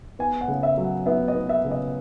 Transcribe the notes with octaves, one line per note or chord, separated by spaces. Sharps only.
B3 G#5
F#5
C#3
E5
F#3
F#5
B3 E5
D#5
B3
E5
C#3
D#5